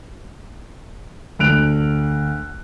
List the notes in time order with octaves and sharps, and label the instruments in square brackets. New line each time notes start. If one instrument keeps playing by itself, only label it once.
[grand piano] D2 D3 F#6 D7 F7